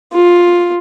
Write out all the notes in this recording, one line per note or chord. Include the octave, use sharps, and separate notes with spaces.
F4